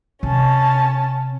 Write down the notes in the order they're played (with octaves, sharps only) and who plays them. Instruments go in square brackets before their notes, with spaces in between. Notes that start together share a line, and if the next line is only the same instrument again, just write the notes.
[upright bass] C3 [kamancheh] C#4 A5